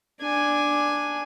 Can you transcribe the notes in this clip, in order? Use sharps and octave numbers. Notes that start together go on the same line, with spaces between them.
D4 G#5